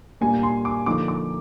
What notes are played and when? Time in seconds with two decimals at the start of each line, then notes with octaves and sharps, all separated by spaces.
0.21 A#2 G3 A#3 D4 G#5
0.43 C6
0.65 D6
0.86 D3 F3 A#3 D#4 D6
1.08 D6